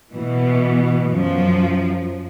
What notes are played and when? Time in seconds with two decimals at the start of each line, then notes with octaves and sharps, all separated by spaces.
0.13 B2 E3
1.11 F#2 F3